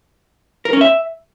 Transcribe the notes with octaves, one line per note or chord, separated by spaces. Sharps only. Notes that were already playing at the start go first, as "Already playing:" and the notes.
A#4
C#4
E5